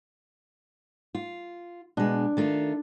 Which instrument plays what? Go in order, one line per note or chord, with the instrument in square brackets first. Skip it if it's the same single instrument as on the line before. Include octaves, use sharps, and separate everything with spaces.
[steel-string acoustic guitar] F4
[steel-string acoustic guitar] B2 G#3 [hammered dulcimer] D4
[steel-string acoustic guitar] D#3 A3 F4